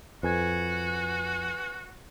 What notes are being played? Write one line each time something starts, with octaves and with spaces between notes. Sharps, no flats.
F2 F#4 B4 G#5 G#6